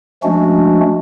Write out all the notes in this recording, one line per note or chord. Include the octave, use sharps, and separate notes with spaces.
F3 G#3 A3 C#4 D4 F#4